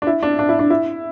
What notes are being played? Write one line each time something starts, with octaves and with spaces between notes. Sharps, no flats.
D4
E4
D4
D4
E4
D4
E4